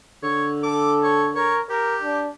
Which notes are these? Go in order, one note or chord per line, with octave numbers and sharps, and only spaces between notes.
D3 C#5
A4 D6
C#5
A#4 C#5
G4 A#4
D4